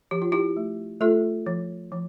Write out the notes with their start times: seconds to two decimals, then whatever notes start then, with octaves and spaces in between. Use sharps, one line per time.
0.11 F3 G4
0.22 F4
0.32 E4 G4
0.57 A3
1.01 A3 F4 A4
1.46 F3
1.92 F3